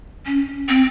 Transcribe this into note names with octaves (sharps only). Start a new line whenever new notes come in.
C#4
C4